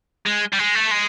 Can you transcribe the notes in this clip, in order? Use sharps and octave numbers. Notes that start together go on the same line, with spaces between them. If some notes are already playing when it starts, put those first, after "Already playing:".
G#3
G3
G#3
A3
G#3